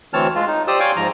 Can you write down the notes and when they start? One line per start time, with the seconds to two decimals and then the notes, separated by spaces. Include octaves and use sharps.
0.13 D2 E3 C4 C#5 A5 F6
0.35 G#3 F4
0.48 D#4
0.68 G4 C5 D5 D#6 E6
0.80 C#5 D5 F5 G5 G#5 C6
0.96 G#2 F3 A#5